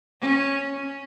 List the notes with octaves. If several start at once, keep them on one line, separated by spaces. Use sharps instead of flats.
C#4
C#4